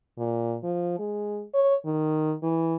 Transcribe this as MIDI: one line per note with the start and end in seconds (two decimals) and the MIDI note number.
0.18 0.56 46
0.64 0.98 53
0.99 1.44 56
1.54 1.76 73
1.86 2.34 51
2.43 2.76 52